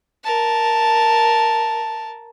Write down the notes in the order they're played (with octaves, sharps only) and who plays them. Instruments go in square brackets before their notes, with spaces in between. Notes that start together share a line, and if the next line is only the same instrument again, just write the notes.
[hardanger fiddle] A#4 A5